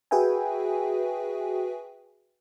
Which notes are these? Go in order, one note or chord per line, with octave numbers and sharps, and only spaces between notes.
F#4 G#4 B4 E5 G5 G#5